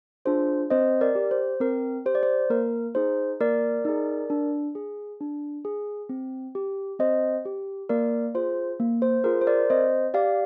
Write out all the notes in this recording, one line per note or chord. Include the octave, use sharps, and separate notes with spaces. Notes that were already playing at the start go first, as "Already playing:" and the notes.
D4 F4 G#4 C5
C4 C5 D#5
A#4 D5
G4
C5
C4 A#4
G4 C5
D5
C5
A#3 A#4
D#4 G#4 C5
A#3 A#4 D5
D#4 G#4
D4
G#4
D4
G#4
C4
G4
C4 C5 D#5
G4
A#3 A#4 D5
F4 G#4 C5
A#3
C5
F4 G#4 A#4
C5
A#4 D5
C4 C5 D#5
G4 D5 F5